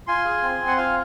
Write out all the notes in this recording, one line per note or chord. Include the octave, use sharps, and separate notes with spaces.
F4 G#5 C6
G#4
C4
C4
F#5
F4 F5 G#5